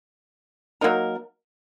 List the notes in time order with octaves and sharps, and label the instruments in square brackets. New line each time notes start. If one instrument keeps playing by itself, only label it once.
[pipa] F#3 A#3 D#4 A#4